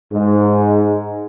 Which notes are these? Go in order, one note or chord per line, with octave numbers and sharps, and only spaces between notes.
G#2